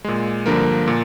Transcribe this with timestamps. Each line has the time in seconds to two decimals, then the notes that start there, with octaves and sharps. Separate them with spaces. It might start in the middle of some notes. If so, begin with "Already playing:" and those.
0.04 A#2 G#3
0.46 G2 D3 F3 A#3 A#4
0.88 A#2